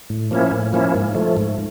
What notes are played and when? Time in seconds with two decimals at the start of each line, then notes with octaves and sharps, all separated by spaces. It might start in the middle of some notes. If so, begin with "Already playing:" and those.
0.10 A2
0.31 F3 A#3 C#4 E4
0.52 A2
0.73 F3 A#3 C#4 E4
0.95 G#2
1.15 F3 A3
1.37 G#2